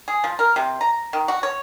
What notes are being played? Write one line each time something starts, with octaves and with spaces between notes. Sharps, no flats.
G#4
F3
A#4
C3
A#5
D#3
F#4
C#5